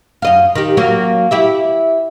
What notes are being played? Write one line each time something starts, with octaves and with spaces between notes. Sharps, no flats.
F#2 D#5 F5
D#3 G4
F#3 A#3 C#4
E4 G4 E5